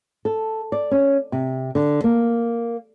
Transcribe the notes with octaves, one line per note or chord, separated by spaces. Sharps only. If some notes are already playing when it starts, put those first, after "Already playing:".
A4
D5
C#4
C3
D3
A#3